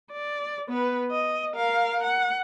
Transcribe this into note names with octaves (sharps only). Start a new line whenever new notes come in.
D5
B3 B4
D#5
A#4 F5
F#5